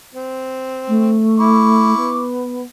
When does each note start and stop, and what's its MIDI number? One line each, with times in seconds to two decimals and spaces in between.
0.15 1.18 60
0.88 1.96 57
1.38 2.22 64
1.38 2.22 85
1.38 2.22 86
1.96 2.62 59